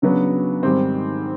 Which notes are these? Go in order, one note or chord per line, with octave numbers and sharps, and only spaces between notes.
C#3 F#3 B3 D4
G#2 D#3 G3 C4